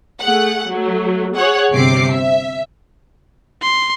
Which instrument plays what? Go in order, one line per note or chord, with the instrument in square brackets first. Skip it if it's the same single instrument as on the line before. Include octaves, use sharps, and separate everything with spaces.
[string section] A3 G#4 F#5
F#3 A3
G#4 C#5 F#5
G1 C3 C4 D6 C7
E5
[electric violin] C6